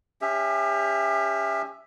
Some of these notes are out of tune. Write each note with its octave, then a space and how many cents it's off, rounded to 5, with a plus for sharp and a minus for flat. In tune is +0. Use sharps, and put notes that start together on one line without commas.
C#4 +15 G4 +35 E5 +0